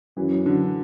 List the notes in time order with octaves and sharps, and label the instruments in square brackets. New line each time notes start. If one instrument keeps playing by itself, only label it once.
[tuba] F#2 [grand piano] E3
[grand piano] D3